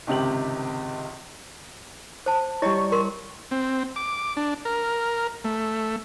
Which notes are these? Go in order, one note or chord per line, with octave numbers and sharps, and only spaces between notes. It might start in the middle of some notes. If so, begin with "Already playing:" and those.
G#1 C#2 C3 G4 F#7
C5 A5
G3 E4 C#5 D#5 C#6
A#4 C6
C4
D6
D4
A#4
A3